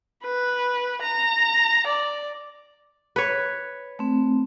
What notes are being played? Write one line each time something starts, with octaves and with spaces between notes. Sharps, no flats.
B4
A#5
D5
B4 C#5
A3 C4